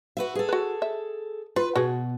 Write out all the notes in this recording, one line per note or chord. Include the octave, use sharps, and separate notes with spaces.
F#4 B4 E5
G#4 A4
F#4 B4
E5
F4 B4
B2 F#4 G#4